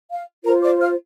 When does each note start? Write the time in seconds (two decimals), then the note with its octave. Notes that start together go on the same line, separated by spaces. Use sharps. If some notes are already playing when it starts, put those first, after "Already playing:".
0.10 F5
0.45 F4 A#4 C5 A#5
0.63 D5 D6
0.81 F5 F6